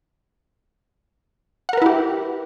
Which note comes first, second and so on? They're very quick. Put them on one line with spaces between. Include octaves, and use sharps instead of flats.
F#5 A#4 B4 E4 G4